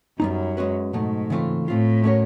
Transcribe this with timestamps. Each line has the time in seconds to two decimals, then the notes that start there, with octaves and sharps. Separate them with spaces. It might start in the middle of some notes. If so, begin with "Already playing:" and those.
0.20 F#2 G3 B3 D#4
0.57 G#3 C#4 F#4 B4
0.93 G#2 B2 F#3 A3
1.30 C#3 E3 A3 C4 F4
1.67 A2 A3 C4 F4
2.04 A3 C#4 F#4 A#4 C#5